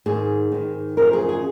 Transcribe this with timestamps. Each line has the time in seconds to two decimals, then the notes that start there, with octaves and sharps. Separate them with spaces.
0.06 G#2 D#3 G#4
0.52 G#2 D#3
0.97 F#2 C#3 F3 A#4
1.13 G#4
1.29 G#4